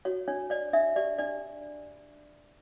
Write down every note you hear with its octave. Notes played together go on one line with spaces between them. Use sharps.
F#4 C#5
D4 C#5
C#5 D5
D4 E5
G4 D5
D4 D5